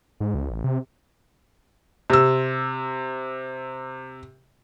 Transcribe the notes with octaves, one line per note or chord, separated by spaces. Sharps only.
G#2
C#2
A1
C3
C3 E6